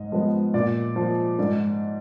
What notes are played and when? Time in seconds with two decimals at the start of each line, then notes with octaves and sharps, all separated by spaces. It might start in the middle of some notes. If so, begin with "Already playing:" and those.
Already playing: G#2 D#5
0.12 F3 G#3 B3
0.54 A#2 D5
0.96 F3 A#3
1.39 G#2 D5